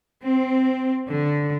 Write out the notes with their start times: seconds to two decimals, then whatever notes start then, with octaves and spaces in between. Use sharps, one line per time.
0.25 C4
1.10 D3